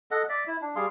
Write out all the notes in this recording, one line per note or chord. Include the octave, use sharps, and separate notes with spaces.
A4 D#5 F#5
D5 E5
E4
D4
G3 G#4 F5 C6